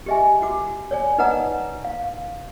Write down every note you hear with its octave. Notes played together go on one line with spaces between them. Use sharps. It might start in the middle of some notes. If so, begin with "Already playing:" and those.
G4 G#4 D#5 E5 G#5
F#4 D6
C#5 D5 G#5
D#4 B4 D#5 F#5 A#5 D#6
F5